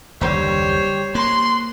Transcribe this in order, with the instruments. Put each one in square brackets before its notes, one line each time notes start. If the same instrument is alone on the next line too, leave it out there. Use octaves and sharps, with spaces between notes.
[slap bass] F#1 D#2 D3 [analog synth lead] G3 [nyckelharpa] C5 C#5
[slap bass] A#3 [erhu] C6 [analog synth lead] F#6